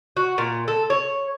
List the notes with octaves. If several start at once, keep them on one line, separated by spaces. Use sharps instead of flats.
F#4
A#2
A4
C#5